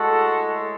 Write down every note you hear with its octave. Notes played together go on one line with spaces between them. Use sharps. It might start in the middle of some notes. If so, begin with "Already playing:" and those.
Already playing: A2 G#3 F#4 A4